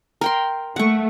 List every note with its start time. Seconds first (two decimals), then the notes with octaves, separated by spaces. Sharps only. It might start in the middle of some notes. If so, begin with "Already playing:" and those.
0.21 A#4 G5 C6
0.76 A3 F#5 C#6